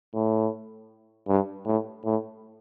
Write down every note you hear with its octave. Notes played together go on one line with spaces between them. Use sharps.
A2
G2
A2
A2